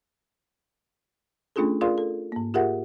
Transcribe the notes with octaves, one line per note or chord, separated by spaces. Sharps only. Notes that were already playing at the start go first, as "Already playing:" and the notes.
A3 C#4 D4 F4 G#4 A4
F4 G#4 A#4 D5 F5 C6
A4
G#2 A#3
F4 G4 G#4 A#4 E5 F#5